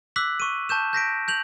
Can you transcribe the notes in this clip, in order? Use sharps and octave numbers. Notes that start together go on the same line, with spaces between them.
D6 E6 F#6 B6 F#7
C#6 D#7
A5 C#6 G6 E7
G6 A#6 B6 D7
G6 F7 F#7